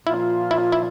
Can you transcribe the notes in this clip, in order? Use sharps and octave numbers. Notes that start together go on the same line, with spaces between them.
A#2 F3 A#3 E4 F4
E4
E4